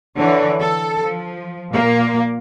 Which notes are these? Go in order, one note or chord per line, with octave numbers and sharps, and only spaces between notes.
D3 E3 C#5
A4
F3
A#2 A#3